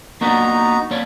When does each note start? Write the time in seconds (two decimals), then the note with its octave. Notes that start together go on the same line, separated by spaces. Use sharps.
0.21 A#3 B3 D4 D#4 F#4 A#5
0.91 A#3 C#5 D5